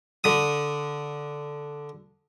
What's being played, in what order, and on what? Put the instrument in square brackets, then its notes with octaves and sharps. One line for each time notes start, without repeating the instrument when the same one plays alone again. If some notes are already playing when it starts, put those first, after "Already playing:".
[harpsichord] D3 D#6